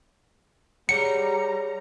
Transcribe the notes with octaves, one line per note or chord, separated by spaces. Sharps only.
G3 G#4 C#5 F#5 A#5 C#7